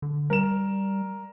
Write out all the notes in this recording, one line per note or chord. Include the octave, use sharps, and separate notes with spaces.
D3
G3 A#4 E7